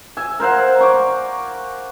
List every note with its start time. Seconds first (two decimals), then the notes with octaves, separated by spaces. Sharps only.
0.17 E5 G#5
0.40 A#4 C5 F5 F#5
0.78 A#5 C#6 D6